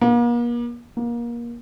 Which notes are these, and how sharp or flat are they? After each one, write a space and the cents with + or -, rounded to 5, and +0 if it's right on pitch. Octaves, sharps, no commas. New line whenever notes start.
A#3 +40
A#3 +25